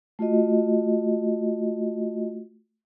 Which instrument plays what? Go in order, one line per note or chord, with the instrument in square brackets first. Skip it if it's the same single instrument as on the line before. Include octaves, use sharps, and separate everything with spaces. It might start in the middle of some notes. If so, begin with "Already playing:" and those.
[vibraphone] A3 F4 F#4 D#5